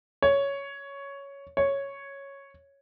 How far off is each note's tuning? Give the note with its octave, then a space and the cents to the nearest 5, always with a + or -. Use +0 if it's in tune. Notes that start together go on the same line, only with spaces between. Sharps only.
C#5 +5
C#5 -5